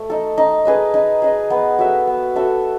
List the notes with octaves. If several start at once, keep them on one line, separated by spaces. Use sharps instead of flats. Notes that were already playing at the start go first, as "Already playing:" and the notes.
Already playing: A3
D#4 A4
D#4
G#4 B4 D#5
D#4
G#4 B4 D#5
B3
F#4 A4 E5
B3
F#4 A4 E5